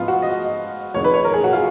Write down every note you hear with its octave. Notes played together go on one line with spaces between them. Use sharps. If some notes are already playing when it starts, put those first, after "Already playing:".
Already playing: G#2 F3 B3 F4
F#4
D#5
F2 D#3 G#3 C#5
B4
C#5
A#4
G#4
F#4
F4